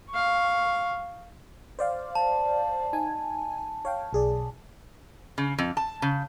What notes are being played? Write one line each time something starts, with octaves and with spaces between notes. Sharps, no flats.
F5 C#6
C5 D5 F5
A5
D#4 G#5
C#5 F5 G5
B1 G#4 D5
C#3
F2
A5
C#3